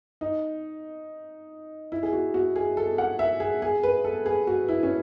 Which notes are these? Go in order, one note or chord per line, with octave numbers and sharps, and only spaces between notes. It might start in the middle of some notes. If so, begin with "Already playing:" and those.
D#4
E4
G#4
F#4
F#4
G#4
A4
F#5
E5
G#4
G#4
B4
A4
G#4
F#4
E4
C#4